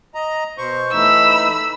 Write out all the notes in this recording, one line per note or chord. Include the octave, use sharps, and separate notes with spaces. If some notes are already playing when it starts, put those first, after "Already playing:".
D#5 A#5
B2 C5 C#6
E3 A3 D#4 B5 E6